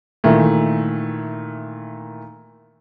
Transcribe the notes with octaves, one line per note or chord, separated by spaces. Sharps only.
A#2 D#3 E3 A3